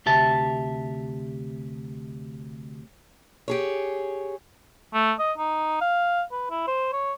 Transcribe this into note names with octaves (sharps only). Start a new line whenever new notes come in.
D2 C3 G4 E5 A5
G4 G#4 C#5
A3
D#5
D#4
F5
B4
E4
C5
C#5